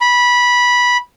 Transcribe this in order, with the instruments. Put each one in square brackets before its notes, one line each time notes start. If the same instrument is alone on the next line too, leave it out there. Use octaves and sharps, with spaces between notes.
[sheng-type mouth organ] B5